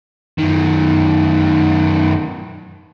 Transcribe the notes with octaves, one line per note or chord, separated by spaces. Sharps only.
F#2 D#3